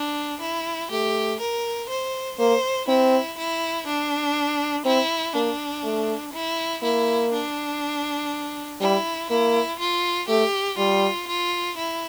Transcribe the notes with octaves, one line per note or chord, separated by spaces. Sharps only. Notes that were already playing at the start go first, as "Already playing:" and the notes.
Already playing: D4
E4
A3 G4
A#4
C5
A#3 C5
C4 E4
E4
D4
C4 E4
A#3 D4
A3
E4
A#3 E4
D4
G3 E4
A#3 E4
F4
A3 G4
G3 F4
F4
E4